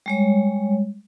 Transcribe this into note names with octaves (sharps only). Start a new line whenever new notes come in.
G3 G#3 C#5